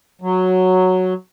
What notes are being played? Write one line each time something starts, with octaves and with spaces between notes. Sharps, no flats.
F#3